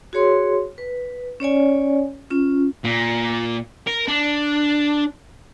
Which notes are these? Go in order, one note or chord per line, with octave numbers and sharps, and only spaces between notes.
F#4 G#4 C#5 C6
B4
C#4 C#5 D5 G#5
C#4 F4
A#2
A#4
D4